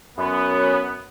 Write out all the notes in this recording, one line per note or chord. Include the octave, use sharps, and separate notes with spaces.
F#2 B3